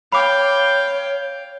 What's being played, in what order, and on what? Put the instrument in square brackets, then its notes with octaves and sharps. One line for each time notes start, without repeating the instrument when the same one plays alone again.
[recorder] C#5 [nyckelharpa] F5 G5 [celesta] B5 D6